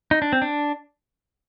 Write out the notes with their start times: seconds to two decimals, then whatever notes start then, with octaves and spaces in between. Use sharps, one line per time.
0.11 D#4
0.22 D4
0.33 C4
0.42 D4